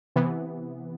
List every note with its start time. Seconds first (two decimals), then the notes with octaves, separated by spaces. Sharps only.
0.16 C3 E3 B3